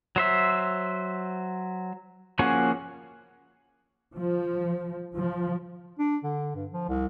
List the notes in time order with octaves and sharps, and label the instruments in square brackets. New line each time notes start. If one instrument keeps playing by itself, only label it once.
[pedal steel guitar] F#3 C5 E5
F3 A#3 C#4 F#4 G#4
[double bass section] F3
F3
[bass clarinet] D4
D3
G2
F3
C2